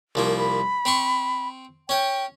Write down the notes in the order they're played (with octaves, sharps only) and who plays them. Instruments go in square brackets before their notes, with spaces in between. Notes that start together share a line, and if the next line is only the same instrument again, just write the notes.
[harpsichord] C2 F3 A#3
[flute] B5
[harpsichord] C4 C6 C#6
[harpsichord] C#4 C#5 [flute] G5